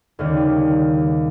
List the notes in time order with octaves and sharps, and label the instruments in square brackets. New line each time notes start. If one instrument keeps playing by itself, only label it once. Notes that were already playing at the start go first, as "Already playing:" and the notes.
[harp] D#2 C#3 G3